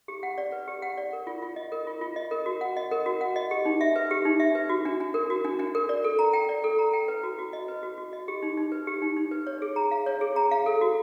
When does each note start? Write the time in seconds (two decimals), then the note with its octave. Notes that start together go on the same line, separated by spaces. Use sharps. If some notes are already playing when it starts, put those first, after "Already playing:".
0.08 G4
0.23 F#5
0.38 D5
0.52 B4
0.68 G4
0.82 F#5
0.98 D5
1.13 A#4
1.27 F4
1.42 F4
1.56 D#5
1.72 A#4
1.87 F4
2.01 F4
2.16 D#5
2.31 A#4
2.46 F#4
2.61 F#5
2.77 D#5
2.91 A#4
3.06 F#4
3.21 F#5
3.36 D#5
3.51 G4
3.65 D#4
3.81 E5
3.96 B4
4.11 G4
4.25 D#4
4.40 E5
4.55 B4
4.69 F#4
4.85 D4
5.00 D4
5.14 A#4
5.30 F#4
5.44 D4
5.59 D4
5.75 A#4
5.89 D5
6.04 A4
6.19 A#5
6.33 G5
6.49 D5
6.64 A4
6.79 A#5
6.93 G5
7.08 B4
7.23 F#4
7.38 F#4
7.53 D#5
7.68 B4
7.83 F#4
7.98 F#4
8.13 D#5
8.28 G4
8.43 D#4
8.57 D#4
8.72 B4
8.87 G4
9.02 D#4
9.17 D#4
9.31 B4
9.47 C#5
9.62 G#4
9.76 A#5
9.91 F5
10.06 C#5
10.21 G#4
10.36 A#5
10.51 F5
10.66 A4
10.81 F#4